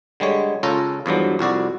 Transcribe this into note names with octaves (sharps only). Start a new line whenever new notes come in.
D3 G3 G#3 C#5
C#2 C#4 F4 A4 A#5
E2 G2 F3 F#3
C2 F2 F#4 D5